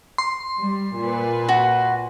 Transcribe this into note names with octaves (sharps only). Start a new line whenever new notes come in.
C6
G3
A#2 B4
F#4